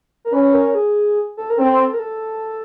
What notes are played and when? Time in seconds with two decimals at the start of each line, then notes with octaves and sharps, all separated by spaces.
0.25 A#4
0.33 C#4 B4
0.53 A#4
0.75 G#4
1.37 A4
1.50 A#4
1.58 C4 A4
1.94 A#4
1.99 A4